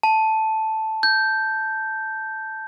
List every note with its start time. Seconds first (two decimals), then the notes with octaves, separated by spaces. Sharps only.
0.03 A5
1.03 G6